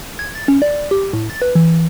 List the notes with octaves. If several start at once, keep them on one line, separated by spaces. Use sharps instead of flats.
G#6
A6
C#4
D5
G4
A2
A6
B4
E3